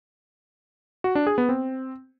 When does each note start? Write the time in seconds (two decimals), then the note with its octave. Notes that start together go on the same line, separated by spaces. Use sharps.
1.04 F#4
1.15 D4
1.27 G#4
1.38 B3
1.49 C4